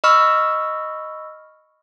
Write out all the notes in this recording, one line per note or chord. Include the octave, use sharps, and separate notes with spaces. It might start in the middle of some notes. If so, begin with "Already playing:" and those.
D#5 B5 C#6 E6 F6